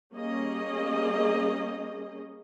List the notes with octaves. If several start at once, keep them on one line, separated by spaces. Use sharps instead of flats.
G3 A#3 C#4 G#4 D#5